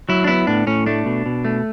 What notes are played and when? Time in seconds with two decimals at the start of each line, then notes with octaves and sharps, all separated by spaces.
0.09 F#3 E4
0.24 D4
0.27 B3 E4
0.47 A2 D4
0.67 A2 C#4
0.86 A3 D4
1.06 B2
1.26 B2
1.45 A3